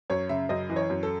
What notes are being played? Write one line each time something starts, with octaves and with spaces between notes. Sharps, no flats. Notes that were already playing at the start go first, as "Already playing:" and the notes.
F#2 C#5
C#3 E5
F#2 D#5
E3
C#5
F#2
A4